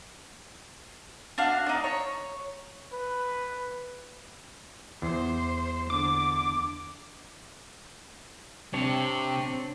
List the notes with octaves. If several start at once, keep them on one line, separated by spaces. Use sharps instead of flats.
D4 F#4 F5
D4 D#4
C#5
B4
E2 C5
D3 D6
C3 C4 D4 C#5